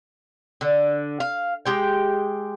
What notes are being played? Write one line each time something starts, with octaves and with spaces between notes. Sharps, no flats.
D3
F5
G#3 G4 G5